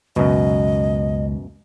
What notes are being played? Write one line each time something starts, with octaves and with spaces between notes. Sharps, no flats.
C#2 F#2 B2 D#5